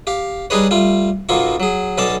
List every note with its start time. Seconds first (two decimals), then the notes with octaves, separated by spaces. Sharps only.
0.07 G4 F5
0.50 G3 D4 D#4 G#4 B4 C#5
0.71 G3 A3 F4
1.29 B1 F#2 B2 A#3 F4 C#6
1.60 F#3 G#4
1.98 B1 B2 C#4 A4 D5 A5